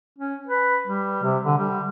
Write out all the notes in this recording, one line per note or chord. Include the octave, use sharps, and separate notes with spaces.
C#4
B4
G3
C3
D3
G3